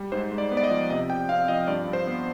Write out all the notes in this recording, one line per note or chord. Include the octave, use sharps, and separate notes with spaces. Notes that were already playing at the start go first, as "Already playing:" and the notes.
Already playing: G3
G#2 C5
G#2
D5
B3
D5
D#5
F3
C3 D#5
C3 G5
C4 F5
F3 D#5
G2 D5
G2
C5
B3